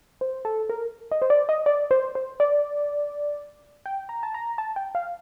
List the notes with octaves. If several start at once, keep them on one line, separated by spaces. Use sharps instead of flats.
C5
A4
A#4
D#5
C5
D5
D#5
D5
C5
C5
D5
G5
A#5
A5
A#5
A5
G5
F5